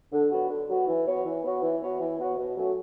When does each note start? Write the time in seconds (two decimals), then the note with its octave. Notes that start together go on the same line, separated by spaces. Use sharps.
0.12 D3
0.32 F#3 B3 F#4
0.50 D3
0.68 F#3 B3 F#4
0.87 E3
1.06 B3 F#4 C#5
1.25 E3
1.44 B3 F#4 C#5
1.62 E3
1.81 B3 F#4 C#5
2.00 E3
2.19 B3 F#4 C#5
2.37 B2
2.57 F#3 A3 C#4 F#4